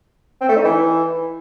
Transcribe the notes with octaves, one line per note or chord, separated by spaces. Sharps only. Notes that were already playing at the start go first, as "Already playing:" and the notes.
C4
A3
D#4
E3